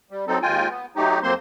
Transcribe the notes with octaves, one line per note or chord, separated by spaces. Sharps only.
G3
F#3 C4 D#4 A4
D#2 G#3 F4 G5 G#5
B3
F#3 A3 D#4 G4
F2 F#3 A#3 C4 C5 C6